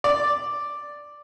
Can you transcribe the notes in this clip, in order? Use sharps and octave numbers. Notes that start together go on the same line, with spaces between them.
D5